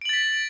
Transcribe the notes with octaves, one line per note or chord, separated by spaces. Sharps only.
A6 B6 D7 F#7